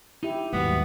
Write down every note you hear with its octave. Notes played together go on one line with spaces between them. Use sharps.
D#4 E4 G4
D#2 G#2 F#3 G3 B3